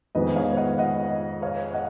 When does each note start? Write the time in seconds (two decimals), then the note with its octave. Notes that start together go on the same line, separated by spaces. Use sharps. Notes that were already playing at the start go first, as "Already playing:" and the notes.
0.15 F2 D#3 G#3 B3 B4 D#5
0.36 C#5 F5
0.57 D#5 F#5
0.78 D#5 F#5
1.42 C#5 F5
1.73 D#5 F#5